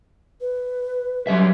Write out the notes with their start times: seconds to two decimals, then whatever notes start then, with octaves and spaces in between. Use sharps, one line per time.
0.41 B4
1.27 F#3 G3 E5